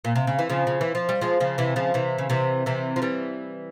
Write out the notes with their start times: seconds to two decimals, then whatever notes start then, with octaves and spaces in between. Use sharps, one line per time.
0.05 A#2
0.16 C3
0.27 C#3
0.39 E3
0.50 C#3 F3
0.67 C#3
0.81 E3
0.95 F3
1.09 G3
1.21 F3 G#3
1.40 C#3 F3
1.58 C3 E3
1.76 C#3 F3
1.94 C3 E3
2.18 C#3
2.30 C3 E3
2.66 C3 E3
2.96 F3
3.02 E3 G3